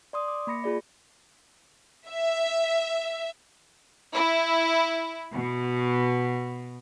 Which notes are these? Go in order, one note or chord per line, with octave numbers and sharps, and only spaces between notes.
D5 C6 D#6
D6
A#3 B5 A#6 C#7
F4 G#4 D5
E5
E4
B2